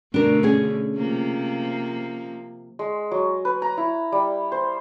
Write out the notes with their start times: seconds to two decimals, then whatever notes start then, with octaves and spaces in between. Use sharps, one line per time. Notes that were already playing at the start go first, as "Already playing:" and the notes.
0.14 B2 D3 A3 D4 A#4
0.43 C#4 G#4
0.97 C3 F3 A#3
2.79 G#3
3.11 F#3
3.45 B4
3.62 A#5
3.77 E4
4.12 G3
4.52 C5